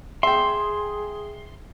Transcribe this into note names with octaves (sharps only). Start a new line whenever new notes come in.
G#4 E5 G5 C6